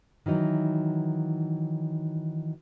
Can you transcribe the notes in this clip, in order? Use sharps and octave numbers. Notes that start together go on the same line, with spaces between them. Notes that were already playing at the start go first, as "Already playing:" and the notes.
D#3 E3 F#3 D#4